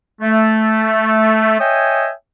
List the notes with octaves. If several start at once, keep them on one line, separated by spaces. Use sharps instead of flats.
A3
C#5 D#5 E5 G5 G#5 D#6